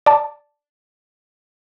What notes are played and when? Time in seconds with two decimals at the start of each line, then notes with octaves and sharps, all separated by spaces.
0.06 D5 A5